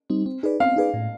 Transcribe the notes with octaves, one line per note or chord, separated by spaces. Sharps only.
G3 C4 D#4
C4
D#4 G#4 B4 D5
C4 F5
D#4 G#4 B4 D5
A2